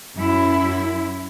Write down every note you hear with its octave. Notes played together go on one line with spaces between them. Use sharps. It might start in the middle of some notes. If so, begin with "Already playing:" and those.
F#2 E4